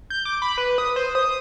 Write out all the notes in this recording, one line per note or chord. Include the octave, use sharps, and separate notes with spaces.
G6
D6
B5
B4
D#6
C5
D#6